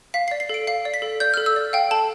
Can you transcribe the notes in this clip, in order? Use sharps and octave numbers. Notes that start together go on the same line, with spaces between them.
F5 B6
C7
D5
C7
A4 D7
F5 C7
D5
B6
A4
D5 G6
A4 F6
E6
D5
F5 G5
A4 A5